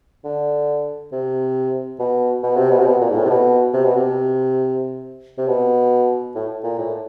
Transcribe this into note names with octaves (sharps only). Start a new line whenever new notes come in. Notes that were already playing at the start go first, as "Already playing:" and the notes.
D3
C3
B2
B2
C3
B2
C3
B2
A#2
G#2
A2
C3
B2
C3
B2
C3
C3
B2
A2
A#2
A2